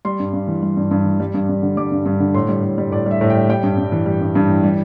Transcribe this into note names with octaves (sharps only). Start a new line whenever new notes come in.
G3 C6
G2
G2
E3
G3
G2
G2
E3
G3
G2
G2
D3
G3 D6
G2
G2
D3
A2 C6
G3
A2
G3
A2 D5
G3 E5
A2
G3 G5
G3 G5
G2
G2
E3
G3
G2
G2
E3
G3